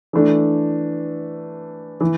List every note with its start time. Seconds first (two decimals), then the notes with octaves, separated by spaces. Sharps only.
0.13 E3 A3 D4
2.01 E3